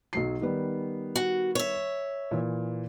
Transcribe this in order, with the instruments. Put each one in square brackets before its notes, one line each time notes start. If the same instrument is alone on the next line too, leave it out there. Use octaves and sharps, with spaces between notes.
[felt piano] B1 F#3 C7
D#3 G3 B3
[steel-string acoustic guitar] F#4
C#5 E5
[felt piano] A#2 E3